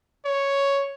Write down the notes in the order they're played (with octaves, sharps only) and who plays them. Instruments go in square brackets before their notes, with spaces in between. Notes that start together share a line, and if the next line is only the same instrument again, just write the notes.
[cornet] C#5